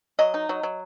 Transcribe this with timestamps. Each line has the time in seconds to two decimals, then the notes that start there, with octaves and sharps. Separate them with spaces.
0.19 F#3 D#5
0.34 D#4
0.49 F#3
0.63 F#3